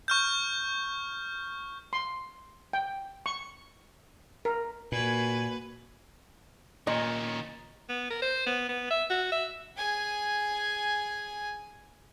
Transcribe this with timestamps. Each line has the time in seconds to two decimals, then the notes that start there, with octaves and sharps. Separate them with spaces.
0.08 C#6 F6 G6
1.93 C6
2.73 G5
3.26 C#6
4.45 A#4
4.92 A#2 A#3 F#4 B4 G#5
6.87 A#2 D#3 C#4 D#5
7.89 B3
8.10 A#4
8.22 C5
8.46 B3
8.69 B3
8.91 E5
9.10 F#4
9.32 E5
9.77 G#4 G#5